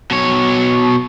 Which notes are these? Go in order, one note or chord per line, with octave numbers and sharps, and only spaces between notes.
B2 C#5